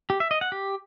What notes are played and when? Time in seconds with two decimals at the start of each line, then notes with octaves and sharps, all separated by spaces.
0.10 G4
0.20 E5
0.31 D#5
0.41 F#5
0.52 G4